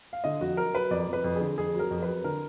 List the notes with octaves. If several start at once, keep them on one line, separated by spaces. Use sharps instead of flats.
F5
D3 D#5
F2 F#4
F#3 A#4
F#3 B4
F2 D5
F2
B4
F2
G#4
D3
F2 G#4
F#3 A#4
F2
B4
F#3
D3 A#4